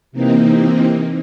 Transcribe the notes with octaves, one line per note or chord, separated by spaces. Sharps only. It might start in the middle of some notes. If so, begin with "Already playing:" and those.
C3 E3 A#3 C4 D#4